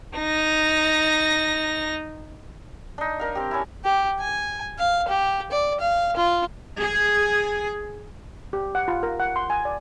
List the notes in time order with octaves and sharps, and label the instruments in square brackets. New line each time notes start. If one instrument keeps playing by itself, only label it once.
[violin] D#4 A#6
[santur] D4 D#4
D4 A#4 F5
C4 G4
C#4 E4
[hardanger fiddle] G4
G#5
F5
G4
D5
F5
F4
[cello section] G#4
[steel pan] G4
F#5
F4
A#4
F#5
C6
G#5
D5